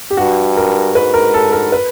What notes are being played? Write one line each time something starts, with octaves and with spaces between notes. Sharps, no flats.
G4
G2 F#4
A#4
G#2 B4
A#4
A4
A#4
B4